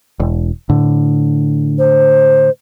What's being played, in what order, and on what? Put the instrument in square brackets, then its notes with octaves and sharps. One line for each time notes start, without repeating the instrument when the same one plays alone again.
[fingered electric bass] E1
A2 D3
[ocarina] C5